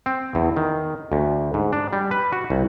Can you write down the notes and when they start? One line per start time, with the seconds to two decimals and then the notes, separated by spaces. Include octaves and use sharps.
0.06 C4
0.35 E2
0.57 D#3
1.12 D2
1.54 G#2
1.73 D4
1.93 G3
2.11 B4
2.32 F#4
2.50 C2